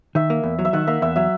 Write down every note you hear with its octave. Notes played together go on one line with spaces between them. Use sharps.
D#3 E5
A#3
E2
F#3
E5
D#3 F#5
A#3 E5
E2 E5
F#3 E5